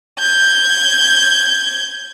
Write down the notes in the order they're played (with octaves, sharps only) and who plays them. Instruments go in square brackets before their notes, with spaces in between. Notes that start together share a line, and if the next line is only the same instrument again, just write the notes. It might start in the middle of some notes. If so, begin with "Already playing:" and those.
[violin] G6 G#6